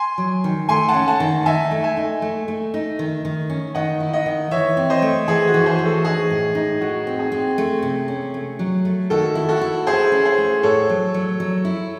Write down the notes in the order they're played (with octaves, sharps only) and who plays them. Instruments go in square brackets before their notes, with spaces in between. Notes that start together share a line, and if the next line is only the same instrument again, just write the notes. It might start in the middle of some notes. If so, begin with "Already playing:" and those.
Already playing: [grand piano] G#5 C6
[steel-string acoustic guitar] F#3
D#3
[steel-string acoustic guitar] A3 [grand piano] G#5 C6
[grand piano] F#5 A5
[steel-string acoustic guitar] C#4
[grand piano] F#5 A5
[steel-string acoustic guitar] D#3
[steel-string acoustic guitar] D#4 [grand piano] E5 G#5
[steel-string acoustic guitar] A3
[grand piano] E5 G#5
[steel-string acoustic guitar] D#4
A3
A3
D#4
D#3
D#3
C#4
[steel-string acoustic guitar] D#3 [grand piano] D#5 F#5
[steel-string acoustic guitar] E4
[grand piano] D#5 F#5
[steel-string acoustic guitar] D#3
[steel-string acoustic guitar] E3 [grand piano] C#5 E5
[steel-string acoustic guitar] C4
[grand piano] C5 D#5
[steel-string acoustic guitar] A3
[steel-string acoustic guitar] E3 [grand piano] G#4
[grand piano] F#4
[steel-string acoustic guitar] E3
[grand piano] G#4 C5
[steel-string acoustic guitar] E3
[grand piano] F#4 A4
[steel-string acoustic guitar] D#4 [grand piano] G#4
[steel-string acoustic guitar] A2
D#4
[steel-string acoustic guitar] A2 [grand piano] F#4
[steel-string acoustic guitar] C4
[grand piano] G#4
[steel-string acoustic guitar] C4
A3
C3
C#4
A3
F#3
A3
[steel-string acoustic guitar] D#3 [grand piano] F#4 A4
[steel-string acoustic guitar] E4
[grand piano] F#4 A4
[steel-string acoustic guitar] E4
[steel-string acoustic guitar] E4 [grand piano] G#4 C5
[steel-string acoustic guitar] C#4
[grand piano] G#4 C5
[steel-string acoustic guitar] A3
[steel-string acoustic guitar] A2 [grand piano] A4 C#5
[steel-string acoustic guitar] F#3
F#3
F#3
E4